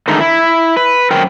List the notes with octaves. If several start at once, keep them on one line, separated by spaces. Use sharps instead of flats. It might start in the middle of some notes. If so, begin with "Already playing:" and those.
D3 D#3 G#3 A3 D#4
E4
B4
F#2 A#4 C5 G5